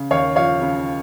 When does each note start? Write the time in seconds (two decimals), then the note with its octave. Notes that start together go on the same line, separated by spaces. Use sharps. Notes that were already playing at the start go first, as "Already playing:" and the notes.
Already playing: C#3
0.11 D#2 C#5 F5
0.36 F3 C#5 F5
0.61 C#3